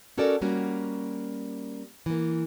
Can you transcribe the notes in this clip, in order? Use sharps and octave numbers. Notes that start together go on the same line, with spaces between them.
C#4 F#4 A4 A#4 D5
G3 A#3 C#4 F#4
E3 A#3